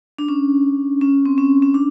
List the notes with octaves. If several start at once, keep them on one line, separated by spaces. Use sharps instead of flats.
D4
C#4
C#4
C4
C#4
C#4
D4